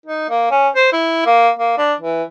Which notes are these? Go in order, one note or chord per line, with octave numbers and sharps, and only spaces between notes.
D#4
A#3
C#4
C5
E4
A#3
A#3
D4
E3